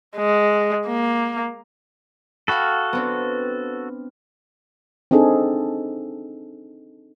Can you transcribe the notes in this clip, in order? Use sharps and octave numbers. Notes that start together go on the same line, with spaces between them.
G#3
A#3
F#4 A4 F5 G5 B5
B3 C4 D4
C4 D4 D#4 G#4 A4